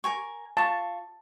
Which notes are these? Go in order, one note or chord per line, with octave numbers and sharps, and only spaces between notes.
A#4 G#5 C#6
F4 A5 C#6